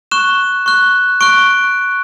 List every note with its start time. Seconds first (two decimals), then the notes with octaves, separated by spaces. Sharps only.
0.11 C#6 F#6 E7
0.66 C#6 F#6
1.21 C#6 F#6 D7